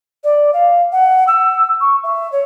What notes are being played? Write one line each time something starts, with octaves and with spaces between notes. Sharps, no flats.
D5
F5
F#5
E6
C#6
E5
C#5